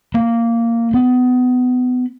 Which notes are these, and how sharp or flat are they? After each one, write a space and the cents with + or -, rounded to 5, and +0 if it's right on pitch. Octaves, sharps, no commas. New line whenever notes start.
A#3 -10
B3 +25